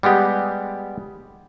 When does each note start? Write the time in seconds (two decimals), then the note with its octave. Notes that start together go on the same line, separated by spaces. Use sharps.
0.03 G3 G#3 B3 G4